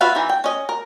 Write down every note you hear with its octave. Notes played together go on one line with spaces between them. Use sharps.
F4 F#4 B4 E5 F5
E3 D#4 E5
G5
C#4 D#5
A#4